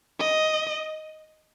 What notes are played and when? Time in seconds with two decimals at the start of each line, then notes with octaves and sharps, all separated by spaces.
0.19 D#5